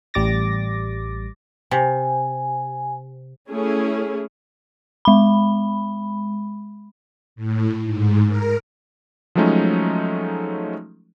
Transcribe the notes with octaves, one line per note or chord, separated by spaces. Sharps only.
A1 G3 D6 A6 A#6
C3 G#5
A3 C#4 E4 G#4
G#3 B5
A2
G#2
A#4
F3 F#3 G#3 A3 C#4 D#4